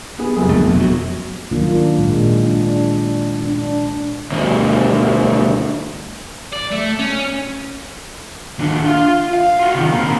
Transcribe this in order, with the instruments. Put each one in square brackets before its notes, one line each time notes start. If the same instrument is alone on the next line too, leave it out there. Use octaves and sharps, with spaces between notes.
[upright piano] B3 G#4
F1 F#2 G#4
[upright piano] F#2 B2 [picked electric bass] D3 A3
[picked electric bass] F#1 F2
F3 F#3
[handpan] D#3 F#3 A#3 D4 F4
A#2 G#3
D4
D4
[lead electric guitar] D2 B2
[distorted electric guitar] D5
A3
C#4
[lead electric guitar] D#2 D4
F4 F5
F5
F4 F#4
C3 D#3
A#3 C4